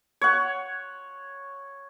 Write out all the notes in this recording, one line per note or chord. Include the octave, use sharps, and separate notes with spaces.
C#5 F#5